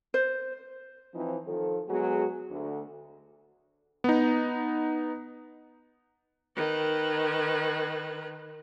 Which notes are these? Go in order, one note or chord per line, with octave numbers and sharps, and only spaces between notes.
C5
E3 F3 C4 D#4
D#3 F3 A4
F#3 G#3 B3 F#4 G#4
D2
B3 D#4
D#3 B4